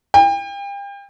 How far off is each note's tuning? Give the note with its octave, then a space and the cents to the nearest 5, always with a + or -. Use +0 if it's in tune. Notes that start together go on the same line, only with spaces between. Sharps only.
G5 +35